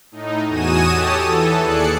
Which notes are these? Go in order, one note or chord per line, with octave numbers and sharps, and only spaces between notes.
A2 D#4
E2 F#4 G#5 D#6 D#7 E7
G4 A4 C#5 A5 D#6
E3 A4
D#2 G#4 D5 F#6 C#7